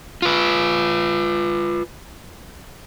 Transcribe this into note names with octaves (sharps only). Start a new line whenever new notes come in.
F4 B4